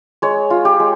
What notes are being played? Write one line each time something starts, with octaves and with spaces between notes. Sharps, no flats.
G#3 C#5
F4
G4
G#3